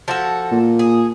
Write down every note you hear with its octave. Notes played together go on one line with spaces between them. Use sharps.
F3 F#4 A4
A#2
G#4